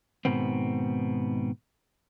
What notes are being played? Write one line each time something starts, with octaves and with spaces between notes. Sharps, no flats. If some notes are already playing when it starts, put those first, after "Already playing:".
G#2 B2 D#3 B3 C4